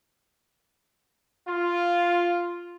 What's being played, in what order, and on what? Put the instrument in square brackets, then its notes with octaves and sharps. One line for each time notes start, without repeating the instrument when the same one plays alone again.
[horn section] F4